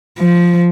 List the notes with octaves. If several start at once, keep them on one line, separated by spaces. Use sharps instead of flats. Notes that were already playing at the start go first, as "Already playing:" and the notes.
F3